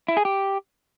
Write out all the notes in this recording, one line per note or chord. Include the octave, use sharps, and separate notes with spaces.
E4
G#4
G4